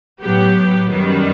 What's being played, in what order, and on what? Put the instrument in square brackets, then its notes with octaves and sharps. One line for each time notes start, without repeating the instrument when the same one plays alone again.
[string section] A2 F#3 B3 G4
F#2 D#3 G3 B3